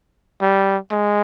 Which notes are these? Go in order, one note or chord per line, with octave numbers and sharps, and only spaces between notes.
G3
G#3